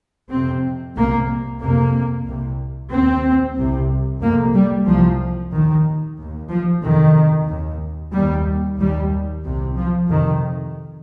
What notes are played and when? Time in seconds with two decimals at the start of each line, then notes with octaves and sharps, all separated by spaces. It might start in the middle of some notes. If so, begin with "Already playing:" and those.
0.30 F2 C3 C4
0.95 C2 C3 A#3
1.60 F2 C3 A#3
2.26 C2 C3
2.91 D#2 C4
3.56 C2 C3
4.21 F2 C3 A#3
4.54 G3
4.87 C2 C3 F3
5.52 D#2 D#3
6.18 D#2
6.50 F3
6.82 F2 C3 D#3
7.48 D#2
8.13 D#2 G3
8.79 D#2 G3
9.43 C2 C3
9.76 F3
10.09 F2 C3 D#3